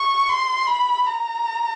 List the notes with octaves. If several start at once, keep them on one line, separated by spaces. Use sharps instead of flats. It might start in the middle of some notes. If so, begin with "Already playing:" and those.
Already playing: C#6
C6
B5
A#5